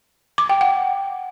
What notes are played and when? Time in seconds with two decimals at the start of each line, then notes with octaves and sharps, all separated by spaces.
0.38 D6
0.50 G5
0.61 F#5